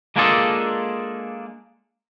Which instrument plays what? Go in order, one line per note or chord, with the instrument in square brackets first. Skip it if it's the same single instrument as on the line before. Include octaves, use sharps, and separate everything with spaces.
[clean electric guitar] G#3 A#3 D4 F4 G#4 A4